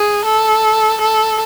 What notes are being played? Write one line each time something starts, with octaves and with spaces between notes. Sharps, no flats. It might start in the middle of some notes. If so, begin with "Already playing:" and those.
Already playing: G#4
A4
A4